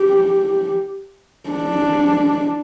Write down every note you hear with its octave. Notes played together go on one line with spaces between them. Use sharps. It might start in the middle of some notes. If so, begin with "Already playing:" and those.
Already playing: G4
D4